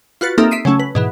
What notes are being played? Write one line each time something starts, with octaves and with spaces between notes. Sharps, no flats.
F4 F#4 B4 A6
A#3 C4 D#4 G4 A4 E5
E5 B6 C7 D7 D#7
C#3 F#3 A3 C#4
B4
G#2 B2 E3